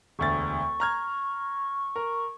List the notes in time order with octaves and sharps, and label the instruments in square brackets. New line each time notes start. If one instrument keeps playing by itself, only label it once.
[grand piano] E1 D2 A6 [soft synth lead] C#6
[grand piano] A#5 F6 G#6
A#4